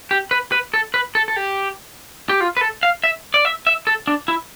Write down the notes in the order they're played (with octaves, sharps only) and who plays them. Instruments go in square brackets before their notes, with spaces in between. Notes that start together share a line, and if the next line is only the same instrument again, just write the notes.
[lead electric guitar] G4
B4
B4
A4
B4
A4
A4
G4
G4
F4
B4
A4
F5
E5
D5
E5
E5
A4
D4
E4